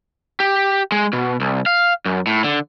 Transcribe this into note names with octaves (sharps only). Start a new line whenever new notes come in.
G4
G#3
B2
C2
F5
F#2
A2
D3